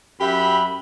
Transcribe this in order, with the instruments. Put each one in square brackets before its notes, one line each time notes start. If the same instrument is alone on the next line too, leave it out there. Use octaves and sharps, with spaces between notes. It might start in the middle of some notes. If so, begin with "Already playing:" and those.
[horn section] F#2 G4 E5 B5